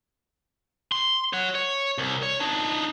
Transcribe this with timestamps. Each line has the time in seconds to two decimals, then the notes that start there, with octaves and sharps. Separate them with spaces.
0.92 C6
1.33 C#5 F#5
1.55 C#5
1.98 C2
2.23 C#5
2.40 D4 D#4